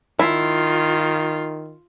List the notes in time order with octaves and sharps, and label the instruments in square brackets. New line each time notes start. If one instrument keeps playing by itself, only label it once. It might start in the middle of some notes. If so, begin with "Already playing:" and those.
[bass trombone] D#3 [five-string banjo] E4 [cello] F4